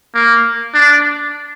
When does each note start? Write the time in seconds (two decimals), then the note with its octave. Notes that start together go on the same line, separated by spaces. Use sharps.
0.15 A#3
0.74 D4